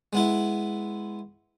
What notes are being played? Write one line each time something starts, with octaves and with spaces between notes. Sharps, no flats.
G#3 B3 E4